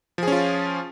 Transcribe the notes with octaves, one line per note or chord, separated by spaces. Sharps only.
F3 C#4 F4 G#4